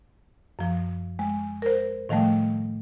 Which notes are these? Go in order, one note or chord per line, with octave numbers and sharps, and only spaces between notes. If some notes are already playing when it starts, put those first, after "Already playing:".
F#2 F3
G#3
A#4 C5
A2 D#3 F3 G3 A3